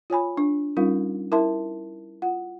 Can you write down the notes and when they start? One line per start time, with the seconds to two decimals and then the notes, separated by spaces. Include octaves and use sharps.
0.10 F4 C#5 G#5 B5
0.37 D4
0.77 G3 C#4 D#4 F4 A#4 F5
1.32 E4 A#4 E5 A5 C6
2.22 F4 F#5